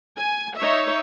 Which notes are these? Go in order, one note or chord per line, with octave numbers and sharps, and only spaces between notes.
G#5
D#4 C#5 E5